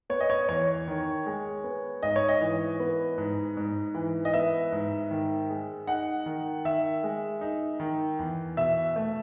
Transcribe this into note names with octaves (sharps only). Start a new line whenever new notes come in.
B3 C#5
D#5
C#5
E2 C#5
D#3
G#3
B3
G#2 D#5
C#5
D#5
E3
B3
G#2
G#2
E3
D#5
B3 E5
G#2
D#3
G#3
D#4 F#5
D#3
D#3 E5
G#3
D#4
D#3
E2
B2 E5
A3